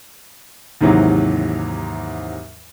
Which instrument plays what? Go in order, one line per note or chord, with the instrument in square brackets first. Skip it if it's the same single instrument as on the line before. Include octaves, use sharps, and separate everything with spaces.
[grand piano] D#2 G#2 C3 E3 F#3